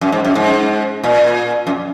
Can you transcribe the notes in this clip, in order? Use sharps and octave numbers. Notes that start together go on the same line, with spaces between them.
F#2
G#2
F#2
G#2
A#2
F#2